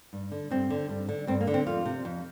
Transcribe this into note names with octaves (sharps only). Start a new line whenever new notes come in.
G2
D3
G2 C4
D3
G2
D3
G2 C4
A#3
D3
C4
F2 F4
C3
F2